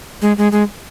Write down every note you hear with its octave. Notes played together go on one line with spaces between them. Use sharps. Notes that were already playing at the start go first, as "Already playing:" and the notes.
G#3
G#3
G#3